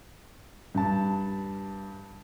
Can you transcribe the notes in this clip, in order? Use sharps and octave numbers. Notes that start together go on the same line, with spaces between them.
G2 A5